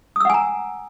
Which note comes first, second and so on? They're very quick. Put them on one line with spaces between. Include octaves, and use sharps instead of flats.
D#6 E6 F#5 G#5 A#5